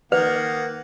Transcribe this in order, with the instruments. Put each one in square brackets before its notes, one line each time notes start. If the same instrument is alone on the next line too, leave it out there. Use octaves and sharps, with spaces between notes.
[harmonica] D#3 A#3 F#5 [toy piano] B4